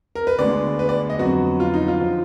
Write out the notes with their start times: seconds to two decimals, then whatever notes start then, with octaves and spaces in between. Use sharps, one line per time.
0.15 A#4
0.27 B4
0.39 D2 D3 G#3 B3 D5
0.79 B4
0.89 D5
1.10 D#5
1.19 F2 D3 F#3 B3 F#4
1.60 F4
1.74 D#4
1.88 F4
2.00 D3 F3